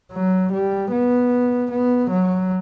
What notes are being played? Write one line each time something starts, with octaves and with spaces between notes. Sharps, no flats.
F#3
G3
B3
B3
F#3